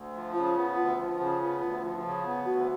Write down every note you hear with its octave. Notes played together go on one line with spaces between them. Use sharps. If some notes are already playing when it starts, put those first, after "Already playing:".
Already playing: D2
F3
C#3 F4
B3
D2 F4
F3
C#3
B3
D2
F3
C#3
B3
D2 F#4